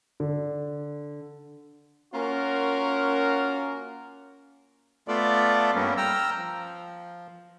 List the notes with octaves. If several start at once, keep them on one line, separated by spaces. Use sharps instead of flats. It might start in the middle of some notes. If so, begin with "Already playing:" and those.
D3
A#3 C#4 F4 F#4 A#4
A3 B3 F4 A4 D5
G2 G3 A#3 B3 C#4
G5 A#5 E6 F6
F3